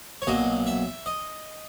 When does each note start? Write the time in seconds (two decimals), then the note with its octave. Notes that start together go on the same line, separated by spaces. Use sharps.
0.22 C#5
0.27 B1 A#2 F#3 D#5
0.67 E5
1.06 D#5